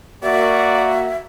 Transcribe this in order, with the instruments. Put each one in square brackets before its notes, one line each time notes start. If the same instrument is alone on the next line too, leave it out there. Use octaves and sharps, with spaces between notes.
[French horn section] A#3 F#4 [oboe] D5 [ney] E5